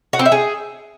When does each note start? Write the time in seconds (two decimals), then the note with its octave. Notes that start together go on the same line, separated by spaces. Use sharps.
0.13 F#4
0.19 C4
0.26 E5
0.32 G#4